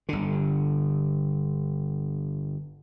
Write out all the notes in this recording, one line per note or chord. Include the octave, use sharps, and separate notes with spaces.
G1 D3